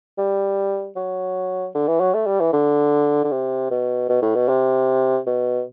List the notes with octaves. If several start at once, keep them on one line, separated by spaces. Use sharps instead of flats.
G3
F#3
D3
E3
F#3
A3
G3
E3
D3
D3
C3
B2
B2
A2
B2
C3
B2